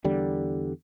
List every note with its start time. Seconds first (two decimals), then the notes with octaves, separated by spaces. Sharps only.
0.04 E2 D3 G3